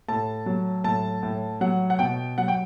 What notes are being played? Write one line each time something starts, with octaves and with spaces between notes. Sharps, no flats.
A2 A5
F#3
A2 A5
A2
F#3 F#5
F#5
B2 G5
F#3 F#5
G5